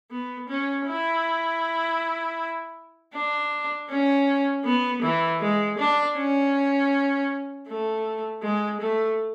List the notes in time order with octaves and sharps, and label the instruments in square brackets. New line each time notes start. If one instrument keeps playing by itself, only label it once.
[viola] B3
C#4
E4
D4
C#4
B3
E3
G#3
D4
C#4
A3
G#3
A3